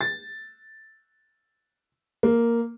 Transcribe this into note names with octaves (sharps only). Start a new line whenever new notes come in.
A6
A#3